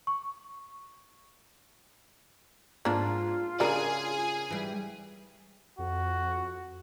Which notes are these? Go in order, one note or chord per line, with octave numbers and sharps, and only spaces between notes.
C#6
G#2 A#3 D4 F4
C#3 G3 D4 G#4 A#4 F5 G#5
E3 G3
F2 F#4